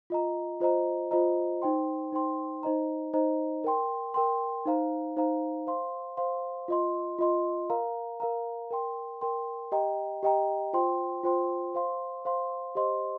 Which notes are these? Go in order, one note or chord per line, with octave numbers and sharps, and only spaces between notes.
F4 D#5 A#5
F4 C5 D#5 A#5
F4 C5 D#5 A#5
D#4 C5 G5 C6
D#4 C5 G5 C6
D#4 C5 D#5 A#5
D#4 C5 D#5 A#5
A#4 G5 C6
A#4 G5 C6
D#4 C5 F5 A#5
D#4 C5 F5 A#5
C5 F5 C6
C5 F5 C6
F4 D#5 C6
F4 D#5 C6
A#4 F5 A#5
A#4 F5 A#5
A#4 G5 C6
A#4 G5 C6
G4 D#5 G5 A#5
G4 D#5 G5 A#5
F4 C5 G5 C6
F4 C5 G5 C6
C5 F5 C6
C5 F5 C6
G4 C5 D#5 C6